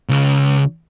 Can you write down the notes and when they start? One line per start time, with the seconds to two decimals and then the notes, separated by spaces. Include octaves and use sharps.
0.09 C#2 C#3